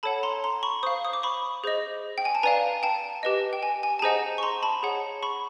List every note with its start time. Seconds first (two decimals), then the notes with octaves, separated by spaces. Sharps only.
0.03 A4 C#5 F#5 A5 B5
0.23 A#5 C6
0.44 A#5 C6
0.63 B5 C#6
0.83 C5 F5 C#6 D#6
1.05 D#6
1.13 D6
1.23 B5 C#6
1.64 G#4 C5 D#5
2.18 G5
2.25 G#5
2.35 A5
2.43 B4 D5 F5 G#5 A#5
2.83 G5 A5
3.23 G4 B4 D#5
3.53 G5
3.63 G#5
3.83 G#5
3.99 A5
4.02 G#4 C5 D#5 F#5 G#5 A#5
4.38 C#6
4.43 A#5 C6
4.63 A5 B5
4.83 G#4 C#5 F#5
5.23 B5 C#6